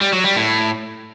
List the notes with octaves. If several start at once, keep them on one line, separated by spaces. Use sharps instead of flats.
G3
F#3
G3
A2